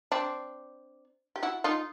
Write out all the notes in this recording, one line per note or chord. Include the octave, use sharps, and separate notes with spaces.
C4 D4
G4
E4 F#4
D#4 F4